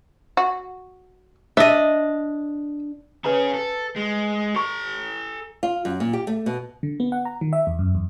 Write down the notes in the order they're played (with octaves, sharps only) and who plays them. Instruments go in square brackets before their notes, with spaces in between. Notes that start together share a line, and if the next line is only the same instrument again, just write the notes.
[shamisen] F#4
[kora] D4 D#5 [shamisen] E5
[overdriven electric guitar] C#4 G#4 [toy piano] B4 A#5
[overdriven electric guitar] A4
G#3
[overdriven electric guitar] A4 A#5 [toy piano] C#6
[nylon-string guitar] F4
F#2
A#2
G4
A3
B2
[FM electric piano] D3
B3
F#5
A#5
D#3
E5
E2
F#2
E2